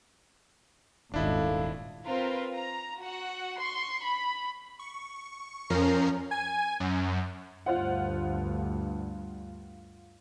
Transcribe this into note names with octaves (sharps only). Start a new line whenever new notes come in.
D#1 G#1 D4 E4 A4 D#5 F5
C4 F4 A#4 B4
A#5
F#4 F#5
C6 C#6
B5
C#6
F2 F3 C#4 A#4 A#5 C7
G#5
F#2
D2 G2 F4 C5 F#5